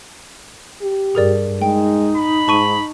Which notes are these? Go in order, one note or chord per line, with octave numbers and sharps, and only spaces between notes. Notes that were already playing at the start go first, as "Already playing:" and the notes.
G4
G2 G#4 A#4 D5
G#3 D#4 G5
B5
G#2 A5 C#6 D#7